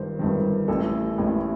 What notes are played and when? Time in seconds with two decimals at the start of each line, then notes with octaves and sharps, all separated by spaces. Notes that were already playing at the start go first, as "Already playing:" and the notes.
Already playing: G1 G2 D#3 C5
0.19 G1 G2 D#3
0.68 A1 A2 A4
1.18 A1 A2